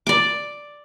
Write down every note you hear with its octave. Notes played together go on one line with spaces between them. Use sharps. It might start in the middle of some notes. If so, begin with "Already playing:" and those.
D5 D6